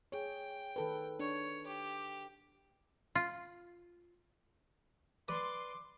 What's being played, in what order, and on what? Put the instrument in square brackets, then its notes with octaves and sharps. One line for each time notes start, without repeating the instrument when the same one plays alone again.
[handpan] G#4 C#5 [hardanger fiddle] G5
[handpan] D#3 A4 B4
[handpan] D4 [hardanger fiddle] C#5
[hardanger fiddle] G4
[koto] F4
[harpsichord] B4 D5 [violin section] C6 D6